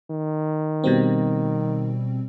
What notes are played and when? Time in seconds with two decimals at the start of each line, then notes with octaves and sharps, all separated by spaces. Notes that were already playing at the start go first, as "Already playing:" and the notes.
0.10 D#3
0.84 B2 G3 C4